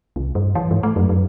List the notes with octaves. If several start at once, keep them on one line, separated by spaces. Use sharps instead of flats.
C2
G2
E3
G#2
A3
F#2
F#2